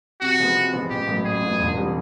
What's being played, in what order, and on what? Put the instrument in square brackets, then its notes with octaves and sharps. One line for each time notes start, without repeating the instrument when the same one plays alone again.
[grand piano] C3 [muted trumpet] F#4
[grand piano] F3 G#3 B3
C3
F3 G#3 B3
[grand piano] A1 [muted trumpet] G4
[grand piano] A2 F#3 B3
[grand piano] A1 [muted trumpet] G#4
[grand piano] A2 F#3 B3
E1
C3 E3 G3